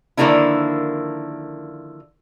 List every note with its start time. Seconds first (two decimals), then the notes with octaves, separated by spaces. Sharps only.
0.17 D3 D#3 F3 A#3 D4 E4